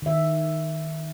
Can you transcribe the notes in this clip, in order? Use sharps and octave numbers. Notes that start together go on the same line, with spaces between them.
D#3 E5